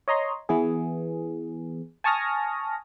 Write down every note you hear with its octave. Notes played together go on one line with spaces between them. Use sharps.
C#5 D#5 A#5 C6
E3 B3 G#4
G#5 A5 C#6 D#6 F6 A#6